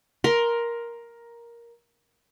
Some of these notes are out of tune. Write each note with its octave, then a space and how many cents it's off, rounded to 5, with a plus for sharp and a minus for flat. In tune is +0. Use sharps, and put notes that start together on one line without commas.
A#4 +10 C6 +0